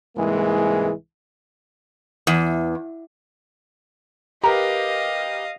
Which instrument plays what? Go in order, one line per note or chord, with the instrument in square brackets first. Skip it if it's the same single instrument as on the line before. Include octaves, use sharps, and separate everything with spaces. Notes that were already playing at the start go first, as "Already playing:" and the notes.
[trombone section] C2 G#2 E3 G#3 A#3 G#4
[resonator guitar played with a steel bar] E2
[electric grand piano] G4 A#4 B4 [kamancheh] D#5 F5 [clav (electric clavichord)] A#5